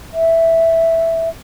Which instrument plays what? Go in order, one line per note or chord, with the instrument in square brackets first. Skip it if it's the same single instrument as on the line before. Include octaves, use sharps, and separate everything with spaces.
[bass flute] E5